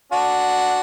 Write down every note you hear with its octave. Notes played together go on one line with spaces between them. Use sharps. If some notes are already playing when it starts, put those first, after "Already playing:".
D4 F#4